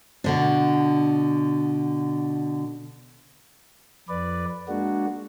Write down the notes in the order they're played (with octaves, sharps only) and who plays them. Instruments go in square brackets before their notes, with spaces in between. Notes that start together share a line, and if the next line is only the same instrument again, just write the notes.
[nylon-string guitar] B2 D3 D4
[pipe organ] F2 B4 D5
G#3 A#3 D4 F#4